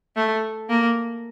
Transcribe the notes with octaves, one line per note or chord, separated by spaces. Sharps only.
A3
A#3